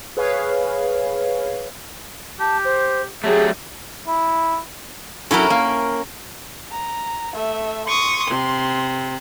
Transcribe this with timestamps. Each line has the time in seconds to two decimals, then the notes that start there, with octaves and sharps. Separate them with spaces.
0.17 G#4 B4 C#5 F5
2.40 G4 A5
2.64 C5
3.24 F#3 A3 G4 G#4
4.07 E4
5.31 F#3 C#4 E4 A4 A#4
5.50 A#3
6.71 A#5
7.33 A3 E5
7.88 C6 C#6 D#6
8.31 C3